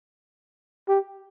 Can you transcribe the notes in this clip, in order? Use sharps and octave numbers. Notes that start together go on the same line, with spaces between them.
G4